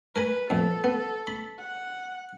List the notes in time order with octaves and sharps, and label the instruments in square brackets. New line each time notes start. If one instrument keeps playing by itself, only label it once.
[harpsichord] A#4 G#5 B5 [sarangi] B4
[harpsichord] F2 A#2 [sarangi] A4
[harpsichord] B3
B5
[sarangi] F#5